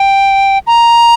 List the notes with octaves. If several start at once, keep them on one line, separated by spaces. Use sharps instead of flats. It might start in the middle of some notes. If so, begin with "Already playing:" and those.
Already playing: G5
A#5